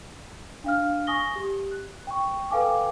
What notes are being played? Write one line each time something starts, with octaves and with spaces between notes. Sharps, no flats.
D4 F5 F6
G#5 C#6 D#6 A#6 G7
G4
F#6
G5 C#6
A4 B4 F5 G5 G#5 D6